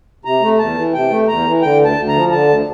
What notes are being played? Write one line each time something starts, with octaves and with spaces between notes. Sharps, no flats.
C3 A#5
A3
E2 A5
E3
C3 G5
A3
E2 A#5
E3
D3 G5
D2
A5
D2
A#5
F3
D3 A5
D2